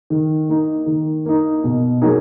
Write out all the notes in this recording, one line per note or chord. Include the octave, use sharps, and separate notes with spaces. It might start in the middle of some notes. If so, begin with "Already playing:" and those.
D#3
A#3 D#4
D#3
A#3 D#4
B2
F#3 A#3 D#4 G#4